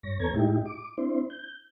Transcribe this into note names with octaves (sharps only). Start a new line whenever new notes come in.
G2 C#5 A#6
E2 B3 A4 C#5 A#5 G#6
A2 G#3 D#4 E4 G4
D6
C4 D4 E4 C5
G6